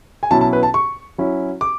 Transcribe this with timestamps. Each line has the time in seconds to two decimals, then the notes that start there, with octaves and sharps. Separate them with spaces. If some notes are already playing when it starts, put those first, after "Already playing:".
0.23 G#5
0.31 B2 F#3 C#4 E4 A5
0.41 A5
0.53 B4
0.63 A5
0.74 C#6
1.18 F#3 C#4 E4
1.61 D6